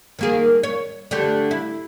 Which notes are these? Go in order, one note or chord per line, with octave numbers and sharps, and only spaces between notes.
D#3 A#3 G#4
C#5
D3 A3 G4
E4